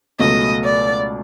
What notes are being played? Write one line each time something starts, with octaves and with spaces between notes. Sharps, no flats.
C#2 B2 F#3 A3 D#5
D5